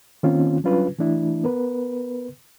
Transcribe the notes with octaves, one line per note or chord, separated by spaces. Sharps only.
D#3 A#3 C4 C#4 F4
F#3 G3 C#4 D4 F4 B4
E3 A3 D4 E4
B3 A#4 B4